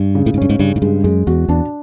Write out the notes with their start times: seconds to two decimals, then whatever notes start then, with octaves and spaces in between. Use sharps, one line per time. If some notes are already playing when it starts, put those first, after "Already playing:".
Already playing: G2
0.15 C#3
0.26 A2
0.34 G#2
0.38 G2 C#4
0.50 G#2
0.59 G2 C#3
0.76 G#2
0.82 G2 G#3
1.04 F#2 G#3
1.27 E2 F#4
1.48 E2 D4